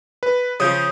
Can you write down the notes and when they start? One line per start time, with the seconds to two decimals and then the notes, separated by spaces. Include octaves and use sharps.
0.23 B4
0.60 C#3 F3 D#6 G6